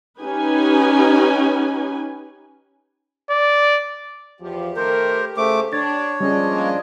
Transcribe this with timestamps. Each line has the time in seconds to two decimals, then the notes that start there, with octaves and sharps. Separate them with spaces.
0.21 C#4 D#4 G4 B4 G#5
3.30 D5
4.41 E2 F3 G4
4.76 D#3 A3 A#4 C5
5.37 C#3 A3 C5 D6
5.73 D4 C#5 A6
6.20 F3 G3 C#4 D4 G#4 D#5
6.51 G#3 A#3